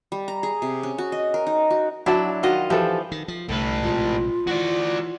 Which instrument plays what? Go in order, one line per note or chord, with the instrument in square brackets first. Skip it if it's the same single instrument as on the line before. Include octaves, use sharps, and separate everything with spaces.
[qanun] G3
A#5
G#4
C3
C#4
F#4
D#5
A#4
D#4
F#4
[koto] F#3 D4 E4 [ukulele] F#4 A5
[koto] D#3 F4 D#5 [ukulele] F#4
[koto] E3 F3 [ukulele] G4 A4
[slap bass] D#3
F3
[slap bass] C2 D3 [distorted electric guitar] A2 B4 [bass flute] A3
[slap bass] A#1 C3 G#3 [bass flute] F4
[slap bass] E3 [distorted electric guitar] F#4 D5